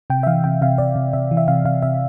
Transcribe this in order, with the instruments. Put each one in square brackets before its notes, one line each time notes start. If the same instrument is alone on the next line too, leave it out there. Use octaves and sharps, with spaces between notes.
[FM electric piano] C3 G5
E5
E3 F5
C3 G5
C3 F5
C3 D5
C3
C3 E5
E3
E5
C3 F5
C3 F5
C3 E5